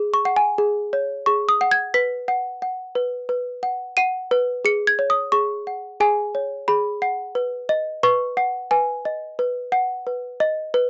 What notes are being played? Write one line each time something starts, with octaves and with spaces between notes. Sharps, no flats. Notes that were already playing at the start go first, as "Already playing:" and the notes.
Already playing: G#4
C#6
F#5
G#5
G#4
C#5
G#4 C#6
D#6
F#5
G#6
B4 B6
F#5
F#5
B4
B4
F#5
F#5 D#7
B4
G#4 C#7
G#6
C#5
D#6
G#4 C#6
F#5
G#4 G#5
C#5
G#4 B5
F#5
B4
D#5
B4 C#6
F#5
B4 G#5
D#5
B4
F#5
B4
D#5
B4